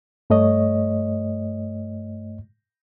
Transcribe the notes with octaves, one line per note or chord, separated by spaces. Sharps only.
G2 A3 C#5 D#5